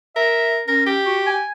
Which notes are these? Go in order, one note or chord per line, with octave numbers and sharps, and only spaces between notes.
A#4 E5
C#4 A#4
G4
F#4
G#5